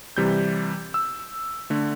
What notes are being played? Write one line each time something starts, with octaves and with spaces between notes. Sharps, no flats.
C3 E3 G3 G6
E6
D3 A3